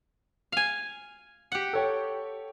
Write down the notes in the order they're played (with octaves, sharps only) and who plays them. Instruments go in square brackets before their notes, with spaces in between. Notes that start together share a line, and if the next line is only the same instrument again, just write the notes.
[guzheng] F5 G#5
G4 F#5
[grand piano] A4 C#5 G5